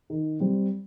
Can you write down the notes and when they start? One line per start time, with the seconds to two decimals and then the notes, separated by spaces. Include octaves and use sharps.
0.10 D#3
0.40 G3 C4